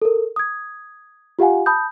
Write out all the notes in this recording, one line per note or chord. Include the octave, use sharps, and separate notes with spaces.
A4 A#4
D#6 G#6
F4 G4 F5 F#5 G#5
A5 B5 D#6 G6